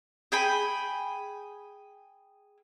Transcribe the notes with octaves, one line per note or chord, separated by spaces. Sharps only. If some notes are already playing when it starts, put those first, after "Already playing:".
G#4 G5 B5